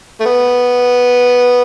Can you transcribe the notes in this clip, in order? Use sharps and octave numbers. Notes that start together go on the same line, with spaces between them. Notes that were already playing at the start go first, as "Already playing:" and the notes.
A3
B3